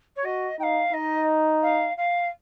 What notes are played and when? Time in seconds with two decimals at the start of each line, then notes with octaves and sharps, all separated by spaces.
0.16 C#5
0.24 F#4 D#5
0.59 D#4 F5 G5
0.93 D#4 D#5
1.62 F5
1.97 F5